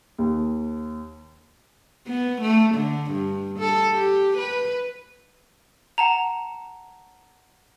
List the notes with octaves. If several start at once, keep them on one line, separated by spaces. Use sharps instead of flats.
D#2
B3
A3
D3
G2
A4
G4
B4
F#5 A5 A#5